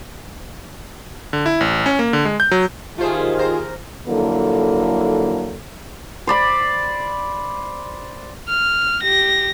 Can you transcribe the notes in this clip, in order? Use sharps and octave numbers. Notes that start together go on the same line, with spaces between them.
D3
E4
A1
C#4
A#3
D3
G#3
G6
F#3
D#3 A3 F4 G4 G#4 C5
D#2 A#4 C5
D3 F3 F#3 A#3 E4 A4
C5 D5 B5
F6
G4 A#6